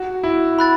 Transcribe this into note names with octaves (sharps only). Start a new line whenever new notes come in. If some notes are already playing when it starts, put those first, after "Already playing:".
Already playing: F#4
E4
B5 F#6 A6